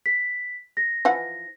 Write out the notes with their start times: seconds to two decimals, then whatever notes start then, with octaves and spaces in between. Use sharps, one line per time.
0.06 B6
0.77 A#6
1.05 E3 F3 F#5